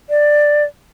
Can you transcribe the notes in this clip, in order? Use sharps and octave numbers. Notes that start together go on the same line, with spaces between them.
D5